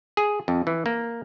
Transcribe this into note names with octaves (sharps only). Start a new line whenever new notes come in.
G#4
F2
E3
A#3